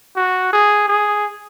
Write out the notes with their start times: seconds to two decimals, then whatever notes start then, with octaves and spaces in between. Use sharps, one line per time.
0.16 F#4
0.53 G#4
0.88 G#4